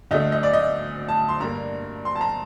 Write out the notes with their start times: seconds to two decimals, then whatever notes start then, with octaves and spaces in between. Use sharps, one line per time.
0.11 D2 D3 A3 D#5
0.32 D#5
0.43 D5
0.53 D#5
1.09 A5
1.29 C6
1.40 G2 D3 G3 A#3 A#5
2.05 C6
2.16 A5
2.21 A#5